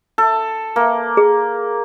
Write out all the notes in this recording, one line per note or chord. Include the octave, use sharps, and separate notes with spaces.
A4
A#3
G#4